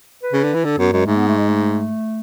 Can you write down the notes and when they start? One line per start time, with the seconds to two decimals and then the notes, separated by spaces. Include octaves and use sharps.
0.23 B4
0.33 C#3
0.44 D3
0.54 E3
0.64 D3 A4
0.78 F#2 B3
0.92 F#2 G#3
1.06 G#2 A3
1.17 B3
1.28 A3
1.38 G#3
1.49 A3